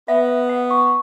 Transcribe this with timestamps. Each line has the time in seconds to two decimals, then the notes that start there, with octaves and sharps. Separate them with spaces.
0.08 B3 E5
0.28 E5
0.49 F#5
0.70 C#6